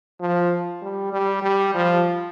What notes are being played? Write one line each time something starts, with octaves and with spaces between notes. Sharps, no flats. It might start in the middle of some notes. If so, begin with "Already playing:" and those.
F3
G3
G3
G3
F3